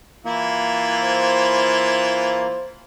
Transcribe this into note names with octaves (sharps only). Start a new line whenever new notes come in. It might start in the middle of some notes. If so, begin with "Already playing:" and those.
E3 A#3 E4 F4
C5